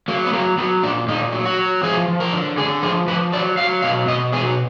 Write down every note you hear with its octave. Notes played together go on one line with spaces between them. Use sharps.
F#3 A#3
B3
F#3 A#3
F#3 B3
A#2 D4
A#2 D#4
F#3
F#4
F#3
F3 G#4
F3
A#4
D3
D3 G#4
F3 G#4
F3 B4
F#3 D5
F#3 F5
B2 F5
B2 D#5
F#3 G#4